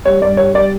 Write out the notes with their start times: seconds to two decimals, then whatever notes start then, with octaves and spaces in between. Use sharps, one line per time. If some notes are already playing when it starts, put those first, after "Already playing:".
0.05 G3 C#5
0.21 G2 D5
0.37 G3 C#5
0.54 G3 D5